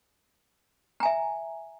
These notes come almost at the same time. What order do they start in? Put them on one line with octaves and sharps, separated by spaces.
A#5 G#5 E5